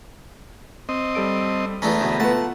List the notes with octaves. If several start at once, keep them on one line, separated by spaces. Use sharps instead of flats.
C4 D#5
G3 A4 D7
E2 A3 C#4 B4 A#5
D2 B2
A3 B3 F4 F#5 A5